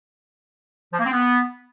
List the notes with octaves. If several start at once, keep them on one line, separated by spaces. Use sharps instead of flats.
F3
A#3
C4
B3